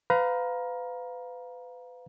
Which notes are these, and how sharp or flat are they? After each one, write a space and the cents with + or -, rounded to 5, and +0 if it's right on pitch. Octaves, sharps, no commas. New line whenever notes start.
B4 +35 F5 +10 A#5 +25